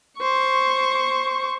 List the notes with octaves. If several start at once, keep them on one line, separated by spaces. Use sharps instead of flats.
C5 C#6